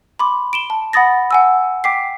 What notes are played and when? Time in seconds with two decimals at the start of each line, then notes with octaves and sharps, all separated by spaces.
0.19 B5 C6 D6
0.53 D7 E7 G7
0.70 A5
0.93 F#5 B5 D#6 A6 A#6
1.31 F#5 G#5 E6
1.84 G5 D6 B6 C7